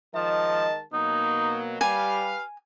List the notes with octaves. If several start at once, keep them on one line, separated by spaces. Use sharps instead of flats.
D#3 F3 G#3 D#5 A5
B2 F#3 A#3 D#4
G3 G4 B4 F5 G#5